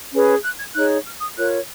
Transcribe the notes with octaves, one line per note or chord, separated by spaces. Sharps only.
C#4 G#4 B4
F#6
G#6
D#4 G#4 C#5 F#6
F6
D#6
F4 A#4 C#5 F#6